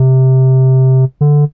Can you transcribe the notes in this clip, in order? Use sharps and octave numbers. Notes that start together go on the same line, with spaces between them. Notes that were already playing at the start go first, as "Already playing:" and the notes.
Already playing: C3
D3